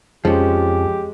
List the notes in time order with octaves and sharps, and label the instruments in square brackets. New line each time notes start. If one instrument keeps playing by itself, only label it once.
[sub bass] F2 [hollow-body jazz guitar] F3 C#4 [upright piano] G#3 [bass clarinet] G4